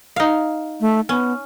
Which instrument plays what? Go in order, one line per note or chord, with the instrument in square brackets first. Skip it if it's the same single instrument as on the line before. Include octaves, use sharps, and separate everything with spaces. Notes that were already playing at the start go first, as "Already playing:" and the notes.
[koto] D#4 F5
[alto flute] A3
[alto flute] B3 [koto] C#4